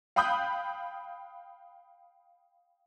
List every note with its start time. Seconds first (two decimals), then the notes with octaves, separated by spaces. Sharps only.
0.16 F5 G5 B5 D#6 F#6 G6